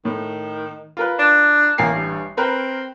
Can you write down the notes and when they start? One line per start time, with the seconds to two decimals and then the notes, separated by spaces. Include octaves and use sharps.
0.05 A2 D#3
0.97 F4 A#4 B4
1.19 D4
1.78 A1 A#3 G#5 C7
1.94 G2
2.37 C4 A#4 B4